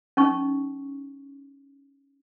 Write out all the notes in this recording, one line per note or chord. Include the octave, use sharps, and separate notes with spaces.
C#4 D#4 C#6